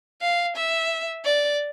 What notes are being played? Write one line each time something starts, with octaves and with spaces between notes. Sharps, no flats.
F5
E5
D5